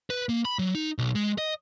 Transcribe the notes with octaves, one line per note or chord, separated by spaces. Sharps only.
B4
A#3
B5
F#3
D#4
B1
G#3
D#5